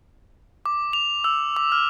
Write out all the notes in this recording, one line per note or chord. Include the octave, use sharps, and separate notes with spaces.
D6
F7
E6
D6
F6